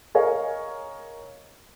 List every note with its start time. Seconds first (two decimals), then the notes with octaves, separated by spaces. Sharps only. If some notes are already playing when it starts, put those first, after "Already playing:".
0.15 G#4 A#4 C#5 D#5 F5 G#5